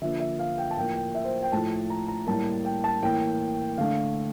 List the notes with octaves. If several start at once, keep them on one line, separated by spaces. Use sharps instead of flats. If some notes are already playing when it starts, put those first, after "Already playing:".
D3 F3 A#3 E5
E5
F5
G5
A5
A2 F3 A#3 G5
G5
E5
C5
G5
A2 F3 A3 A5
A#5
A#5
A2 G3 A#3 A5
G5
A5
A2 E3 A#3 G5
D3 A3 F5